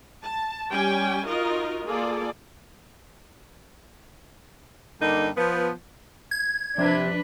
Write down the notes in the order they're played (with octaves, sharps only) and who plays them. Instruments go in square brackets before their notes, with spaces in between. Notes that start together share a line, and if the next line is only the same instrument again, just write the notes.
[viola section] A5
G3 C#4 G4 G5 G#5
D#4 F4 F#4 A#4 D#5
A#3 F4 G#4 A4 D5
[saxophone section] G2 D3 A#3 D#4
F3 B3
[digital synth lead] G#6
[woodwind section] C3 [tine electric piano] F3 [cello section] D4 B4